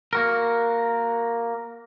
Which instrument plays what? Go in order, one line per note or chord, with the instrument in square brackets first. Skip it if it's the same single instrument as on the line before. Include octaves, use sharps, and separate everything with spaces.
[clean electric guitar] A#3 F#4 A#4